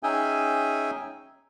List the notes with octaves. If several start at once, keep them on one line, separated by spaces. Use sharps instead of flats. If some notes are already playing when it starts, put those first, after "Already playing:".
C#4 D#4 G#4 E5 G5 G#5